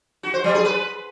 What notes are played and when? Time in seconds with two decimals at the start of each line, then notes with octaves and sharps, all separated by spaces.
0.23 F#4
0.34 C5
0.44 F#3
0.54 G#4
0.65 B4